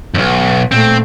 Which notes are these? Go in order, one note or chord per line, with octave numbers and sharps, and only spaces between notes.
B1 F2
A#2 A3 C4